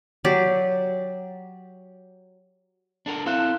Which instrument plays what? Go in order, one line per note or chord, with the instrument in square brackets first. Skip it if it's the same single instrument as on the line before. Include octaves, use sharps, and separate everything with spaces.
[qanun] F#3 G4 D5
[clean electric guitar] D4 A4 A#4
[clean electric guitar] C4 A4 C5 [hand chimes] E4 F5 F#6